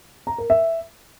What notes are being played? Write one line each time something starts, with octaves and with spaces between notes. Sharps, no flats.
A#5
A#4
E5